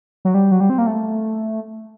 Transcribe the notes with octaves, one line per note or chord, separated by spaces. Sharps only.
F#3
G3
F#3
G3
C4
A#3
A3